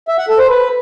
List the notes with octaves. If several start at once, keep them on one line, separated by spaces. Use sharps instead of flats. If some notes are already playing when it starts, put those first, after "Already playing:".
E5
F#5
A4
C5
B4